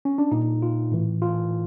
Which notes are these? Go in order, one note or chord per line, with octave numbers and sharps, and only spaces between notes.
C#4
D4
A#2 D#4
F4
A2 E3
F4